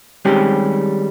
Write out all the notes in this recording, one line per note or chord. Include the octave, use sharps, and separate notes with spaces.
D#3 G3 G#3 C4 C#4 G4